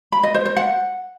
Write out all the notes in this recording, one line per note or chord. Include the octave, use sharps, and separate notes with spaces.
B5
D#5
C5
C5
F#5